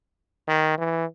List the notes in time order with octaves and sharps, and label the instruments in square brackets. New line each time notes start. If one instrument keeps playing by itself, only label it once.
[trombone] D#3
E3